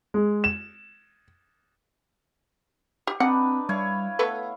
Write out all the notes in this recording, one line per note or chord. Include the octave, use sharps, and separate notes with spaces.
G#3
E7
G4
C4 D4 D#4 B4 F#5
G3 E4 C#5 F5
A3 B3 A4 B4